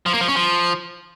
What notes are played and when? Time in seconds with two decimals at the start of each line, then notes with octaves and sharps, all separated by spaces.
0.06 F3
0.13 A#3
0.21 F3
0.28 C#4
0.36 F3